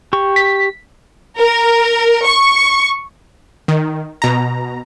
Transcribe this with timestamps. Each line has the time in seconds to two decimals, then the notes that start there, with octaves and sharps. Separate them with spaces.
0.13 G4 C#6
0.36 B6
1.38 A#4
2.25 C#6
3.68 D#3
4.22 B2 A#5